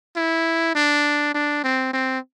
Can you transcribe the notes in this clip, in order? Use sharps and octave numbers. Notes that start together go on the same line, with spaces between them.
E4
D4
D4
C4
C4